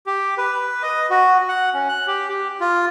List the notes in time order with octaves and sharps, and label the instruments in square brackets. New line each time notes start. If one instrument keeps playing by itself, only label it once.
[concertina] G4
B4
D#5
F#4
F#5
C#4
F#6
G4
G4
F4